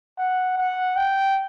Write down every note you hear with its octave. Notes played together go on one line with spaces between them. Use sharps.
F#5
F#5
G5